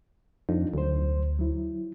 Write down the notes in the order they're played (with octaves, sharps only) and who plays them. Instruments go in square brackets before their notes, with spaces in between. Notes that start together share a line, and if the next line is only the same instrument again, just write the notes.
[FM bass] F2 [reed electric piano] D4 D#4
[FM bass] D2 [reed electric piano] F#3 C5
[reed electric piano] F#3 E4